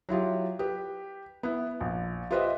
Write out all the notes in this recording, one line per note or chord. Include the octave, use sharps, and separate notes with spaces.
F#3 E4 F4 G4
G4 B4
B3 E4
A#1
F4 G4 B4 C5 D#5 E5